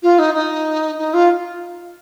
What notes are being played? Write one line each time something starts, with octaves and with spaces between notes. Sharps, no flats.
F4
D#4
D#4
D#4
F4